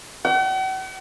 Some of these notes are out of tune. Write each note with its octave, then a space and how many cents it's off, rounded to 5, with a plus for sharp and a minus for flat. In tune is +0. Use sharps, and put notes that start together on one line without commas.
F#5 +45